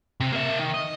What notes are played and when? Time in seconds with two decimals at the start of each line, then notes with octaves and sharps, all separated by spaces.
0.20 C3
0.33 A#3 E5
0.59 D#3
0.74 D#5